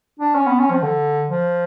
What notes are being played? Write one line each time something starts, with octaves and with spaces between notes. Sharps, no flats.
D4
C#4
B3
C#4
F3
D3
F3